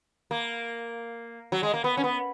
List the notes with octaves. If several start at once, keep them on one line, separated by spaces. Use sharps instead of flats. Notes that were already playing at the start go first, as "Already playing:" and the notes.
A#3
F#3
G#3
A#3
B3
C#4
B3